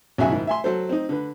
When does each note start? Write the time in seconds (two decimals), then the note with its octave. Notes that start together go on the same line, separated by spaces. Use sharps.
0.18 B1 C#3 F#3 F#4 E5 G#5
0.31 G#2 D#3 E4
0.47 E5 G#5 C6
0.64 F#3 A4 C5
0.89 C4 D#4
1.09 D3 B4